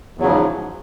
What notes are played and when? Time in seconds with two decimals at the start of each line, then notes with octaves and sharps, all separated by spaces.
0.18 E2
0.20 F#3
0.23 C#3
0.25 F3
0.28 G#2